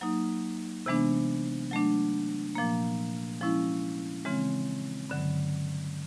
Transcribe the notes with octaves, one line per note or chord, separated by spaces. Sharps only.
F#3 A#3 D#4
C3 E3 G#3 B3 D4
F#3 A3 D4
A#2 F3 A#3
F3 G#3 C#4 E4
C#3 E3 G#3 C4
G2 D3 F#3